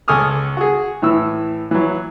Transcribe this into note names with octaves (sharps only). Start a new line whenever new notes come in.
C#2 A4 G#5 C#6 D#6 F6
F#4 G#4
A2 E3 E6
E3 F#3